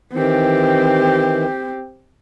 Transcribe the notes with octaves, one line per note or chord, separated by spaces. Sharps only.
D#3 E3 C4 G4